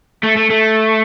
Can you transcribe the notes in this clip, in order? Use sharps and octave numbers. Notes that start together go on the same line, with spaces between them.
A3
A3
A3